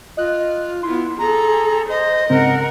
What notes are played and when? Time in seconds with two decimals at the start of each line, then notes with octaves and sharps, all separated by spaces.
0.17 F4 D#5 F#6
0.83 B3 E4 C6
1.19 G#4 A4 A#5
1.89 C5 D#5
2.30 G#2 C#3 C4 A#4 F#5